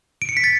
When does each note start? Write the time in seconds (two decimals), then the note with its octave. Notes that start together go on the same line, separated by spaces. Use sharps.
0.22 D7
0.29 C#7
0.37 B6
0.44 A6